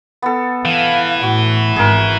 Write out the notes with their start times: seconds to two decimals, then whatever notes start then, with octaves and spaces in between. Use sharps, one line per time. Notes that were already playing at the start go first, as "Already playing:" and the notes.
0.22 B3 A4
0.65 E3 F5
1.23 A2 F#4
1.76 G#1 G#4 A#4